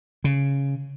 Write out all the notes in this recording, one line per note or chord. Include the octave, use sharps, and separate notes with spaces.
C#3